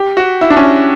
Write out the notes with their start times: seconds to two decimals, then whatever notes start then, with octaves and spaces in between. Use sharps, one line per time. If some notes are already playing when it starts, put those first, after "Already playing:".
Already playing: G4
0.17 F#4
0.41 E4
0.50 D4
0.57 C#4